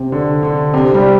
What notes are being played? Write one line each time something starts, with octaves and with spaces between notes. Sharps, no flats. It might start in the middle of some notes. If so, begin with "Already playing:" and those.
Already playing: C3
D3
D3
C3
G3